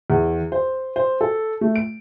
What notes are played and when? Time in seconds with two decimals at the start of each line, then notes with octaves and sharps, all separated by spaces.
0.10 E2
0.52 C5
0.96 C5
1.21 A4
1.61 A3
1.76 D7